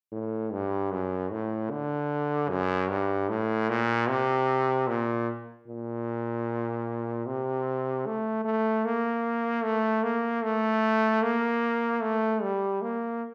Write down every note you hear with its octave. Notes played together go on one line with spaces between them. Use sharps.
A2
G2
F#2
A2
D3
F#2
G2
A2
A#2
C3
A#2
A#2
C3
A3
A3
A#3
A3
A#3
A3
A#3
A3
G3
A#3